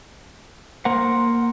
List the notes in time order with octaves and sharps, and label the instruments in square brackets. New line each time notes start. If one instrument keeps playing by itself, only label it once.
[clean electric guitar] A#3 A#4 F#5 [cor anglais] C5